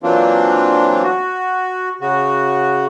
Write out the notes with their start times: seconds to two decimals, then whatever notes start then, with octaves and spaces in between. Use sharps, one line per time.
0.03 E3 F#3 A#3 C4 D4 F4
1.03 F#4
2.01 C#3 F#4